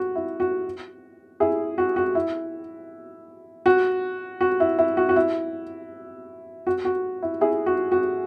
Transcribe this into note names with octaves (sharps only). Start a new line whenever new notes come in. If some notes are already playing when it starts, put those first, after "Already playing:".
Already playing: F#4
E4
F#4
E4 G#4
F#4
F#4
E4
F#4
F#4
E4
E4
F#4
F#4
E4
F#4
F#4
E4
E4 G#4
F#4
F#4